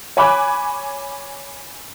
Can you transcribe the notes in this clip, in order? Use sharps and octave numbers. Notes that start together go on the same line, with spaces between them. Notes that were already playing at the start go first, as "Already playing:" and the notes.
C#5 G#5 B5 D6 F#6